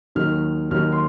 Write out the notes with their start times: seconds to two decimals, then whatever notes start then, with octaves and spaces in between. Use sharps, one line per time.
0.15 D#2 D#3 F#3 F6
0.70 D#2 D#3 F#3 F6
0.92 C6